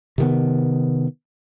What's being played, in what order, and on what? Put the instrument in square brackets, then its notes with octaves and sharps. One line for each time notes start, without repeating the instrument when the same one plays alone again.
[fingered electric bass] C3 D#3 B3